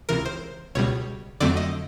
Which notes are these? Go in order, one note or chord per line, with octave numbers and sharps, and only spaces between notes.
C#2 C3 E3 A#4
C5
C#2 B2 G3 C#5
F2 D3 F#3 A3 C4 D5
D#5